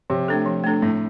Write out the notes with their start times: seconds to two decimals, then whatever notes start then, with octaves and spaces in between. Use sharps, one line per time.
0.10 C3 F3
0.28 A3 D4 A4
0.46 F3
0.64 A3 D4 A4
0.82 A2 C4